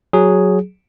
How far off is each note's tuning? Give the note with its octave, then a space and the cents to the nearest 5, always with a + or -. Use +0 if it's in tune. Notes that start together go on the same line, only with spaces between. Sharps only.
F#3 +0 G#4 +0